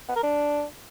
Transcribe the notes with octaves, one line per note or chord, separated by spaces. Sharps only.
B3
A#4
D4